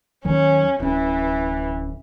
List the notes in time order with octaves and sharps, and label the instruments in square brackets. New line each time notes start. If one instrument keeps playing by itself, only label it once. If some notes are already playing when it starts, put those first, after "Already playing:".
[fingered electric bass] D#2 D#3 F#3 [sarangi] C#4
[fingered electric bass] D1 C#4 [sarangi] E3